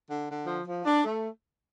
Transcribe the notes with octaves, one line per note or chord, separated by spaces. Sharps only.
D3
D3
F3
F3
D4
A3